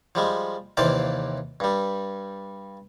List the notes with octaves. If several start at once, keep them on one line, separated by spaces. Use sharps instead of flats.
F3 G3 G#3
D#2 C3 E3 C5 D5 F5
G2 G3